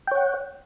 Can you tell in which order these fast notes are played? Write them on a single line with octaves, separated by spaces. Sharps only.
G5 C#5 F#5